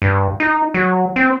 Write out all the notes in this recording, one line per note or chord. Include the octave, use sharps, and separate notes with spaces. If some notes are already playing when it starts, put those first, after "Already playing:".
G2
D#4
F#3
C4